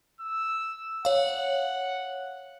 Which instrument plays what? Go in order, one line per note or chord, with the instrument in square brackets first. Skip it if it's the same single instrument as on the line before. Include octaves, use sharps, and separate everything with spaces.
[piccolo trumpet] E6
[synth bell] C#5 F5 [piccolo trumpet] F#5